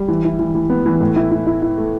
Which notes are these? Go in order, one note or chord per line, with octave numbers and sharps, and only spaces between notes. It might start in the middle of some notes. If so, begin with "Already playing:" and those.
Already playing: G3
E3
E4
E3
E3
B3
E3
A2
E4
E4
E4
E4
A3